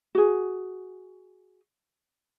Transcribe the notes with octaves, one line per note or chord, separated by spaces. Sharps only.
F#4 G#4